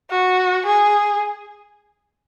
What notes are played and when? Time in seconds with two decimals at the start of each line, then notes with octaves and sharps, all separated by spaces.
0.10 F#4
0.66 G#4